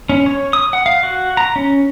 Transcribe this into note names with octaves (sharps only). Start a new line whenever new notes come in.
C#4
C#5
D#6
F#5
F5
F#4
A#5
C#4